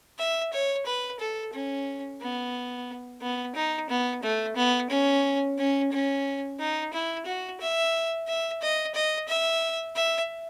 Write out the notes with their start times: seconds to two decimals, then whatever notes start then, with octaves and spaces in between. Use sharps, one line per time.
0.19 E5
0.53 C#5
0.86 B4
1.20 A4
1.53 C#4
2.21 B3
3.21 B3
3.55 D#4
3.89 B3
4.22 A3
4.56 B3
4.90 C#4
5.58 C#4
5.92 C#4
6.59 D#4
6.93 E4
7.26 F#4
7.60 E5
8.27 E5
8.62 D#5
8.94 D#5
9.28 E5
9.95 E5